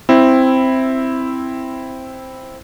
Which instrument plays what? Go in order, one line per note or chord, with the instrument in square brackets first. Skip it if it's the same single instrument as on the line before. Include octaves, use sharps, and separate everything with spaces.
[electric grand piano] C4 E4